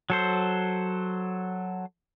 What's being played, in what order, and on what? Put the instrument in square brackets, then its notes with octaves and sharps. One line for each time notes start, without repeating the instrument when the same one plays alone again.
[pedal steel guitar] F#3 A4 C5